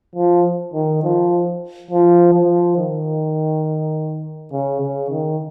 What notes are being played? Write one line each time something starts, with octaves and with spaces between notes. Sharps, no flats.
F3
D#3
F3
F3
F3
D#3
C#3
C#3
D#3